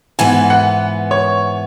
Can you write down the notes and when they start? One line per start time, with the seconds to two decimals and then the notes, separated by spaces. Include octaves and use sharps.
0.19 G#2 E3 B3 G#5
0.50 F#5
1.11 C#5